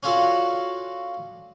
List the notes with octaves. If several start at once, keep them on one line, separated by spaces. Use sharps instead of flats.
C#4 D4 F4 F#4 A4